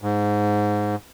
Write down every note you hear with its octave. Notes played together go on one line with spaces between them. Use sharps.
G#2